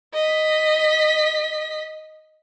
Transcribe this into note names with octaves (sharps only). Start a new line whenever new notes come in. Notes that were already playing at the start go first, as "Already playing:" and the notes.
D#5 B6